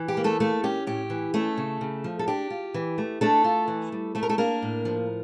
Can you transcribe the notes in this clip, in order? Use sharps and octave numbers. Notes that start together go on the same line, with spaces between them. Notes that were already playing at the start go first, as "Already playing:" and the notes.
Already playing: E3
G4
A#3
A3 A4
A3 A#3 A4
C#4 G4
A2 G4
E3
A3 C#4 A4
C#3
C#3
F3
A4
D4 G4
F4
E3
A3
A3 D4 A4
F4
E3
G3
A3 A4
A#4
A3 A4
A#3 D4 A#4
A2
F3